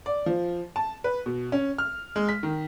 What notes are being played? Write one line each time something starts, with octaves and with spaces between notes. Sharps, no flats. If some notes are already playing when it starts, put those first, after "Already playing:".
D5
F3
A5
B4
B2
C#4
F6
G#3
B6
D#3